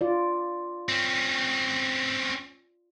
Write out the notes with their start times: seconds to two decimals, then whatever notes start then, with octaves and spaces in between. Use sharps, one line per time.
0.01 F4 D5
0.89 C4 C#4